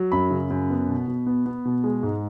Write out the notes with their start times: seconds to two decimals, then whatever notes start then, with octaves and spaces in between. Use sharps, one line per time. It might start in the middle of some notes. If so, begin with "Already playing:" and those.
Already playing: F#3
0.12 F#2 B5
0.31 C#3
0.50 F#2
0.70 B3
0.89 B2
1.08 B2
1.26 B3
1.46 B3
1.65 B2
1.84 G#3
2.03 G#2